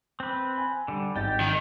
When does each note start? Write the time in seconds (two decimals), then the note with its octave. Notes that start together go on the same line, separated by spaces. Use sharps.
0.20 C4 B4
0.58 G#5
0.88 D3 G3
1.16 G#1 D#4 G4 G5 A6
1.40 D#3